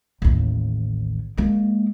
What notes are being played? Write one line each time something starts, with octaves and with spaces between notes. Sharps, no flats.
A1 D#2
G#3 A#3